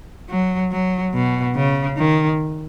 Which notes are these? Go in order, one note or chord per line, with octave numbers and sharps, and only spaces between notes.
F#3
F#3
B2
C#3
D#3